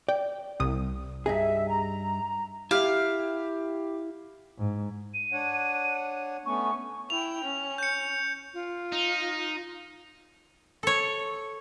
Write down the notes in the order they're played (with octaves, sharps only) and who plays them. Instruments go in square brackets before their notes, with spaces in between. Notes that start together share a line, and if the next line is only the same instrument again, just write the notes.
[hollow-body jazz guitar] D5 [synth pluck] G5
[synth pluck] C2 D#6
[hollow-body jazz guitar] G2 D#4 G#4 [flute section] E5
[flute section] A#5
[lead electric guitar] E4 E5 [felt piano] G4 [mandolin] F5
[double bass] G#2
[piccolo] D#7
[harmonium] D4 C#5 F#5
[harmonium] A3 B3 C#4 [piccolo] C#6
[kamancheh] E4 G5 [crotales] F7
[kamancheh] C#4
[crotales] G6 C#7
[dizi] F4
[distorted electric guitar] D#4
[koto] A4 C#5